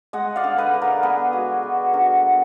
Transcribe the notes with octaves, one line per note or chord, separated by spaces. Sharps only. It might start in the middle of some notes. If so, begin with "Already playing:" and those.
G#3 D#5 F#5
D5 F5
D3
B4 D#5
D3
A#4 D5
B3 G#4 B4
G#3 F#4
D3 F#4
D3 F#4 A#4
B3